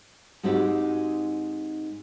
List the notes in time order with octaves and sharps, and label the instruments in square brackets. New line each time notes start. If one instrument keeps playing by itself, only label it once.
[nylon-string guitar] G#2 G#3 C4 D#4 F#4 G4